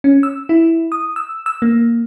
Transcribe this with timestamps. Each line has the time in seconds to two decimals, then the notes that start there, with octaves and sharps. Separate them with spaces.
0.04 C#4
0.23 E6
0.49 E4
0.92 D#6
1.16 E6
1.46 E6
1.62 A#3